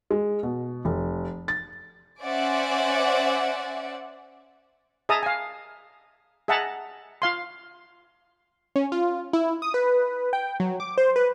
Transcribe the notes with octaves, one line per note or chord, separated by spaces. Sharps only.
G#3
B2
F1
A6
C#4 C5 D5 E5 F#5 G#5
G#4 D#5 E5 A5 A#5 D#6
F5 G#5
G#4 D#5 E5 F#5 A5 A#5
F4 F5 C6
C#4
F4
E4
D#6
B4
G5
F#3
D6
C5
B4